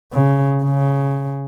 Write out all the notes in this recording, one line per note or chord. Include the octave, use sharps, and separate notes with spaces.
C#3
C#3